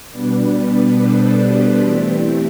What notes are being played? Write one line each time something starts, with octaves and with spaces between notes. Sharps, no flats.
B2 G3 B3 D4 B4 D5
A4 C5
G4 B4
E3 A3 C4 E4 G4